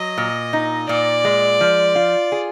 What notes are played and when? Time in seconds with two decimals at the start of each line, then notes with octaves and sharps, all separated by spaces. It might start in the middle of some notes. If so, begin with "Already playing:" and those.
Already playing: F#3 D#5
0.18 A#2
0.53 D#4
0.89 A#2 D5
1.25 G#3
1.61 F3
1.95 F4
2.32 G#4